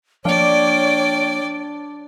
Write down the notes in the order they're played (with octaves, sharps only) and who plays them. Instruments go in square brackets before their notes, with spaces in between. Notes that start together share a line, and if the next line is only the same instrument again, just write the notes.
[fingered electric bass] F3 A#3 [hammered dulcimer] D4 F5 [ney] C#5 [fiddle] D5 G5